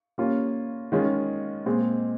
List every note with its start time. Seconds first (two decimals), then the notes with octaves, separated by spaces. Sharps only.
0.18 G3 A#3 C#4 F4
0.92 D#3 G#3 C#4 F4
1.66 A#2 G#3 C4